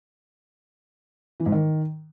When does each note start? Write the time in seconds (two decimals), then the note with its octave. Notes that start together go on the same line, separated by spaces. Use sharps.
1.40 E3
1.46 G#2
1.52 D#3